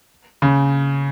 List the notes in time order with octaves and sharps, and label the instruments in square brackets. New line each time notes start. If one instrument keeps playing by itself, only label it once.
[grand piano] C#3